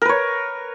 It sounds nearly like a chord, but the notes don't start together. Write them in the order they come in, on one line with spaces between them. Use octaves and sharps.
A#4 B4 C#5